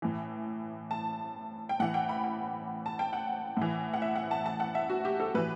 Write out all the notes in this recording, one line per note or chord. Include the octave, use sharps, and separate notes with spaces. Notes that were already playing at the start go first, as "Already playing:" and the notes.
A2 E3
A5
G5
A2 E3 F#5
G5
B5
G5
A5
G5
F#5
A2 E3
F#5
E5
F#5
A5
A5
F#5
E5
F#4
G4
A4
A2 E3 B4